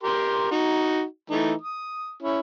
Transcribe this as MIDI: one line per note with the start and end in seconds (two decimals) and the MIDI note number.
0.03 0.47 67
0.03 0.47 70
0.03 0.47 84
0.51 1.03 63
0.51 1.03 66
1.30 1.53 52
1.30 1.53 57
1.30 1.53 63
1.61 2.13 87
2.23 2.40 61
2.23 2.40 64